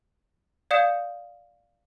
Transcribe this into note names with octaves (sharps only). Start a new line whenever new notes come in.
D5 F5 D#6 G6 C#7 E7